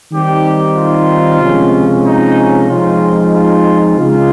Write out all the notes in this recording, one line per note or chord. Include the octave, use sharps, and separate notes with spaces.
D#3 G3 C4 D#4 G4
F4
C3 F3 G#3 C#4
D#4
F3 G#3 C4 D#4 F4
F4
C#3 G#3 D#4 F4